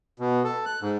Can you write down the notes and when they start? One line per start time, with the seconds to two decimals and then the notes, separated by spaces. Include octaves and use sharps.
0.20 B2
0.44 A4
0.66 F#6
0.81 G#2